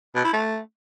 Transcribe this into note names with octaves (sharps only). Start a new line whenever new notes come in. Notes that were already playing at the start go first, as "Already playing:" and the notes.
B2
E4
A3